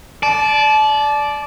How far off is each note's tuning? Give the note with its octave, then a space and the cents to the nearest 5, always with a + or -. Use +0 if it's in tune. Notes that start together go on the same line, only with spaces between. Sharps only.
D5 +0 A5 -30